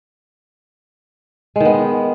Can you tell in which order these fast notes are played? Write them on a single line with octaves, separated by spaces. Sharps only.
G#3 D#3 B3